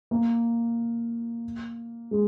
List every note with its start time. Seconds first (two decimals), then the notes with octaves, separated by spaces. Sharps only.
0.11 A#3
2.11 G#3